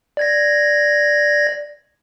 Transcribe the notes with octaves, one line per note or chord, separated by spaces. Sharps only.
D5 G#6 A#6